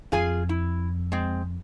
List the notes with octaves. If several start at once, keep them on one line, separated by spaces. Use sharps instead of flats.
F2 F4 G#4 G#5
E4
G#3 C4